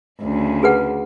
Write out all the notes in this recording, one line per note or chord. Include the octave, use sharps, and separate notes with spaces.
D2 C#3
G#4 B4 F#5